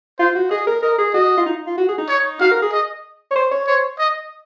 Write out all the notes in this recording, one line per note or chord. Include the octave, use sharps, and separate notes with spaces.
F4 C5
F#4
G#4 D#5
A#4
A#4 D#5
G#4
F#4 D#5
F4
D#4
F4
F#4
G#4
D#4
C#5
F#4 F5
A#4
G#4
D#5
C#5
C5
C#5
C5 C#5
D#5